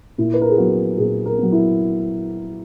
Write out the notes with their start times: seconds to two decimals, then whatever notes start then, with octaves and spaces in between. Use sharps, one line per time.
0.18 A#2 E4
0.34 B4
0.41 A#4
0.49 G#4
0.58 F#3 B3 F#4
0.98 A#2 G#4
1.26 A#4
1.38 F#3 B3
1.52 E4